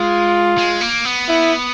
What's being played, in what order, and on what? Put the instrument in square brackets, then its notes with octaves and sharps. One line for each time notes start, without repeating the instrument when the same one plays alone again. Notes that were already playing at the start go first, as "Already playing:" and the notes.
Already playing: [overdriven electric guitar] G#3 [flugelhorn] F4
[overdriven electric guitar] G#3
A#3
B3
[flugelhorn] E4